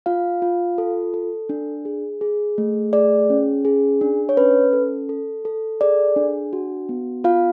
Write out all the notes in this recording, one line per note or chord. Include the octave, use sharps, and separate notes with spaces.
F4 F5
F4
A4
A4
D4
G#4
G#4
A3
G#4 D5
C#4
G#4
D4
C#5
C#4 B4
A4
A4
A4
G#4 D5
D4
F#4
B3
F4 F5